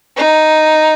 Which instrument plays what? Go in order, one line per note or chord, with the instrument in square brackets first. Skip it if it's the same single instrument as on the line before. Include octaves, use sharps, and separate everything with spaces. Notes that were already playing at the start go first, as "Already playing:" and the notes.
[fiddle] D#4